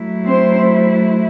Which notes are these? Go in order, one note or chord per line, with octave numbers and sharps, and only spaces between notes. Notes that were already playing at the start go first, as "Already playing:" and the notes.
Already playing: F#3 A3 E4
C4 C5